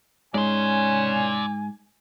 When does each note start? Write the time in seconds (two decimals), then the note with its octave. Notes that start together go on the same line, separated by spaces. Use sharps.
0.34 G#2 C#4 D5 G#5 C6